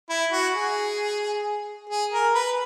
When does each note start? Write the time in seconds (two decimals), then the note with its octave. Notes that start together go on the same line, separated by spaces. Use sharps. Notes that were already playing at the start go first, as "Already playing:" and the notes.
0.10 E4
0.32 F#4
0.55 G#4
1.90 G#4
2.12 A#4
2.35 B4